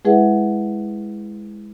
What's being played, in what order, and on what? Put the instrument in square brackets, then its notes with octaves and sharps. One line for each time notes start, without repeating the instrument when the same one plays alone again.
[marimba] G#3 E4 G#4 B4 E5 F#5